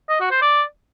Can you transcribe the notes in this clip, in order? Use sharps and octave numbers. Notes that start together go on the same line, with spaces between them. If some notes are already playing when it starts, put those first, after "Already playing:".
D#5
F#4
C5
D5